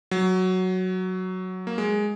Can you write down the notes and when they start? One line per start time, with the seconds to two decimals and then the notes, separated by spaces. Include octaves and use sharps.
0.11 F#3
1.67 A#3
1.78 G#3